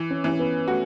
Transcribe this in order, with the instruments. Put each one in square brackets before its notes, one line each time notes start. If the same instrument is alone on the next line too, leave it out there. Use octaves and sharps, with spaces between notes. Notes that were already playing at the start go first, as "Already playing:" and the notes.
Already playing: [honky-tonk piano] E3
[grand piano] C#4
[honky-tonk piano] E3 [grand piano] C#4
[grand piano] B3
[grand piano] A3 [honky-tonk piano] F#4